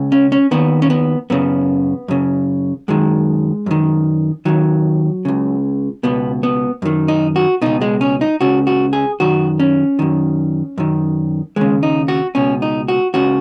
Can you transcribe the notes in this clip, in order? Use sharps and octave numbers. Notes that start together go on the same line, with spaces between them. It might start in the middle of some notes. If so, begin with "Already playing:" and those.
Already playing: C#2 C#3
C#4
C#4
D#2 D#3 B3
C#4
B3
F#2 C#3 B3
F#2 C#3
F#2 D#3 G#3
F#2 D#3
D#2 D#3 F#3
C#2 C#3
C#2 B2 B3
B3
F#2 D#3
D#4
F#4
C#2 B2 D#4
G#3
C#4
D#4
C#2 C#3 F#4
F#4
G#4
F#2 D#3 F#4
C#4
F#2 D#3
F#2 D#3
D#2 C#3 G#3
D#4
F#4
C#2 B2 C#4
D#4
F#4
C#2 C#3 F#4